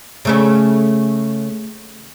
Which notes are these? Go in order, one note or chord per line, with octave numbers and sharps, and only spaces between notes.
C#3 A3 C#4